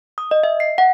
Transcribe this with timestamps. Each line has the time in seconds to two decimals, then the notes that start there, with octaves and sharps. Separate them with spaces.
0.18 D#6
0.31 D#5
0.44 E5
0.60 C7
0.78 F#5